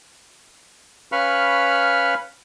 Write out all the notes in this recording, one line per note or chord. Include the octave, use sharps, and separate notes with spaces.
C#4 B4 F5 B5 C#6 F6